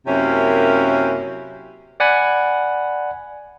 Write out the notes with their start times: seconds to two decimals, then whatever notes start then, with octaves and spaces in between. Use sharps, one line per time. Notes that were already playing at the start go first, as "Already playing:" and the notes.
0.07 F#2 C3 A#3 C#4 E4
2.00 D5 F#5 G#5 B5